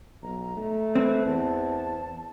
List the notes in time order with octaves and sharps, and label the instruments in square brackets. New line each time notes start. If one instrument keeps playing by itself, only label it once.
[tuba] B1 [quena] A#5
[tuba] A3
[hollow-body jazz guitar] C4 [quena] B4
[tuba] E2 [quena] A5